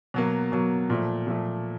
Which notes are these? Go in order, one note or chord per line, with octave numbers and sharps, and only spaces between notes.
B2 F#3 A#3
B2 F#3 A#3
A#2 F3 A3
A#2 F3 A3